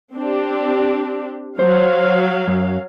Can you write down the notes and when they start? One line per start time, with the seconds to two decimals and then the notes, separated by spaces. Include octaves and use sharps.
0.15 C4 D4 G4
1.59 F#3 C5 F5
2.48 F#2